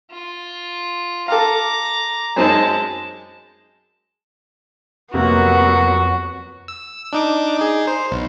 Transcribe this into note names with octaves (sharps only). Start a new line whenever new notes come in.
F4
A4 F5 A#5 D6
F#2 G#3 C4 D#4 A5
F2 C3 F#3 A#3 B3 F#4
E6
D4 D#4 D6
D#4 G#4
C5
B1